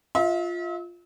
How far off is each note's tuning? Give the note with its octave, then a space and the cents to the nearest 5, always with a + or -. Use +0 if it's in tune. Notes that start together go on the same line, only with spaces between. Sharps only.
F4 +0 E5 -40